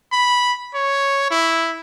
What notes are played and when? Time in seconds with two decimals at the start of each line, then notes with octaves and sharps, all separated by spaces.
0.13 B5
0.74 C#5
1.31 E4